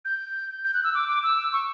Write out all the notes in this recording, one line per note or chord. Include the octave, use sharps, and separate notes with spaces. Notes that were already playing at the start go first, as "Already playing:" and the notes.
G6
G6
F#6
E6
D6
D6
E6
C#6